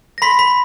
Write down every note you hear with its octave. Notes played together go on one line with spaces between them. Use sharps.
A#6
B5 C6 B6
B5 B6